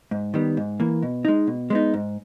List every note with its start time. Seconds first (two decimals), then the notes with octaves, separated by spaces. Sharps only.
0.11 G#2
0.34 D#3 G3 B3
0.57 G#2
0.80 E3 A#3
1.03 B2
1.25 G#3 D#4
1.47 B2
1.70 G#3 B3 D#4
1.94 G#2